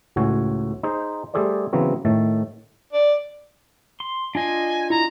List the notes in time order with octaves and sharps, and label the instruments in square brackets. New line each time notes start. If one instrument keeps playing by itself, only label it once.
[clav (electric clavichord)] C#2 A2 F#4 G#5
D#4 G#4 C5
G3 A3 G#4 A4 C5 D5
C#3 E3 F#3 B3 C4
A2 D#3 A3 A5
[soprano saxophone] D5
[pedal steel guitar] C6
[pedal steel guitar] D4 F4 D#5 [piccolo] G#5
[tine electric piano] E4 [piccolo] A#5